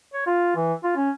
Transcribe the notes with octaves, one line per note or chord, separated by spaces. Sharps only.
C#5
F4
E3
F4
C#4